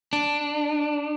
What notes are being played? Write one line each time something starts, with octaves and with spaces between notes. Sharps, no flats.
D4